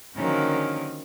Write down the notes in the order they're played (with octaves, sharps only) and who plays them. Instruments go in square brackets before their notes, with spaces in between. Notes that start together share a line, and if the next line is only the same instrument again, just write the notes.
[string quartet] D3 D#3 F3 F#3 A#3 C#4